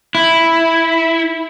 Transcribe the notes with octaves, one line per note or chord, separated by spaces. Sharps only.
E4